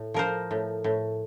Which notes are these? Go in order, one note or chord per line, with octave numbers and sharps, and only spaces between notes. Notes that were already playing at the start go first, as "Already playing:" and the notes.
Already playing: A2
F3 A#4 C5
A2
A2